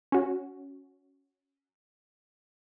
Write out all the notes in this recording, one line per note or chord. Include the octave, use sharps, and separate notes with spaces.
C#4 F#4